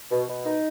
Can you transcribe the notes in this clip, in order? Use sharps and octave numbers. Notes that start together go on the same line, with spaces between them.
B2
B2
D#4